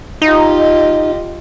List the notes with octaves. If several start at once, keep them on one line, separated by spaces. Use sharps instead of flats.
D#4 F4 G4 D#5